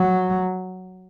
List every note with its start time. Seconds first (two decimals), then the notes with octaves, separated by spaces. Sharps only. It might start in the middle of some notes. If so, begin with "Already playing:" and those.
Already playing: F#3